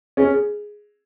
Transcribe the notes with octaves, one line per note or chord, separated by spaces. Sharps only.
C#4 G#4
G#4